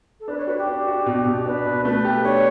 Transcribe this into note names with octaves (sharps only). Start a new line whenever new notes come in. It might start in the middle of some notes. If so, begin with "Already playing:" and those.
A4
D4 B4
C#5
F#4 B4
G4
D4
F#4
B2
B2
D4 B4
B2
A3 B4
G4
D4 C#5